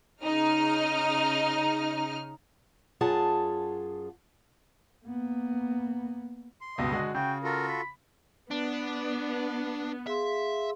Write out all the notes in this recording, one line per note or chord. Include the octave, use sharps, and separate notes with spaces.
C#3 D#4 F6
F#2 F4 G#4 F#5 A5
A#3 B3
C6
C#2 G2 B2 D#5
D3 G#3 F#4
C#3 F#4 G5
F4 F#4 A4 A#4
B5
B3 D4
G#4 E5 F5 C6